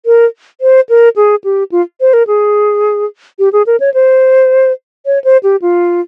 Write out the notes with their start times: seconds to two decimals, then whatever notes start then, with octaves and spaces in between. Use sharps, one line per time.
0.06 A#4
0.61 C5
0.89 A#4
1.16 G#4
1.44 G4
1.72 F4
2.01 C5
2.13 A#4
2.27 G#4
3.39 G4
3.53 G#4
3.67 A#4
3.80 C#5
3.94 C5
5.06 C#5
5.24 C5
5.43 G4
5.62 F4